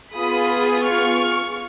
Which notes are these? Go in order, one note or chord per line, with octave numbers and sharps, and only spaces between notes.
B3 F4 G#4 B5 D#6
C#6 F6